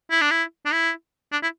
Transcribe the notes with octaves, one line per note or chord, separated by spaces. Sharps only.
E4
D4
E4
D4
E4
D4
E4